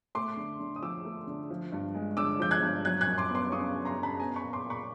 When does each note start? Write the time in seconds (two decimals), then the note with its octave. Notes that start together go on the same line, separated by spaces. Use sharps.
0.15 A3 C6 D6
0.37 D3
0.60 D3
0.76 D#6
0.82 F3 D6 E6
1.05 A3
1.27 D3
1.50 F3
1.72 G2
1.95 G#3
2.17 D3 D6 E6
2.40 F3 G6
2.51 F#6 G#6
2.62 G2
2.84 F#3 F#6 G#6
3.01 F#6 G#6
3.07 F#2
3.18 C6 D6
3.29 B3
3.35 C6 D6
3.52 C#3 C#6 D#6
3.75 F#3
3.85 A#5 C6
3.97 F#2
4.03 A5 B5
4.20 B3 G#5 A#5
4.36 B5 C#6
4.43 A#2
4.53 C6 D6
4.65 A#2
4.70 B5 C#6